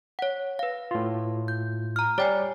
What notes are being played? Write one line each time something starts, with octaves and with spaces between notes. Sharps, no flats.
C#5 F#5
B4 F5
A2 F4
G6
A#5 F6
G3 C#5 D5 G5 G#5